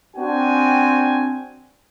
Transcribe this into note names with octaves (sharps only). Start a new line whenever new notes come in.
C4 D4 F#4 G5 G#5